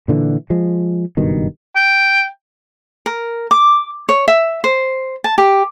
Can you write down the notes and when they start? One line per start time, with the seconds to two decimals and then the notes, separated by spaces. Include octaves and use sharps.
0.08 A#2 D3 E3
0.50 F3 G#3
1.17 F#1 G2 B2 D#3
1.76 G5
3.06 A#4
3.51 D6
4.09 C#5
4.28 E5
4.64 C5
5.24 A5
5.38 G4